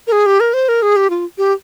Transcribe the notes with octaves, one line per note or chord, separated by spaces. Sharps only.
A#4
G#4
G4
A#4
C5
A#4
G#4
G4
F4
G4